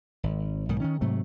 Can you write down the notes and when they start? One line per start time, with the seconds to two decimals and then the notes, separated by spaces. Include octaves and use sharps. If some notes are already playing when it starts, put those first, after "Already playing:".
0.23 G#1
0.69 B1 G#2 D#3
0.81 D#3 C#4
1.01 G#2 C3 F#3 A3